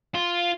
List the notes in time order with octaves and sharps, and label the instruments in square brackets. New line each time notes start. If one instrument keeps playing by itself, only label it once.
[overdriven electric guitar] F4